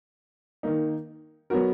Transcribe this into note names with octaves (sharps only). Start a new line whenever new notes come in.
D#3 A#3 D#4
F#3 B3 F#4 A#4